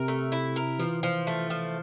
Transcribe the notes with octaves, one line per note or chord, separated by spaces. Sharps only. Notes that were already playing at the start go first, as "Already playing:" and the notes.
Already playing: C3 A#4
A3
E4
A#4
E3 F3
F3
A3
F3